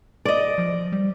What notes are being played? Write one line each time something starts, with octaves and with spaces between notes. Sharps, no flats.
D5 D#5
F3
G3